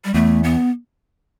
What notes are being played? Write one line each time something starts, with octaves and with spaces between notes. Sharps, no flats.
G3
E2 A3
B3